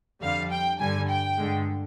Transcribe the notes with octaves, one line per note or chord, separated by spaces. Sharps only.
F2 D3 G3 F5
G5
G2 D3 G3 G#5
G5
G2 D3 G#3